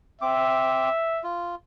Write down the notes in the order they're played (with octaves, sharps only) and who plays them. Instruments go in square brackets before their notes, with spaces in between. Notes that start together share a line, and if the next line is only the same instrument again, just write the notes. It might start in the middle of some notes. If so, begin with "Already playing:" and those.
[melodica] C4 D6 [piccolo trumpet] E5
[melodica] F4